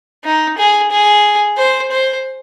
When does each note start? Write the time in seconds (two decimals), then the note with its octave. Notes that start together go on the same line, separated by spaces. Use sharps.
0.24 D#4
0.58 G#4
0.91 G#4
1.57 C5
1.91 C5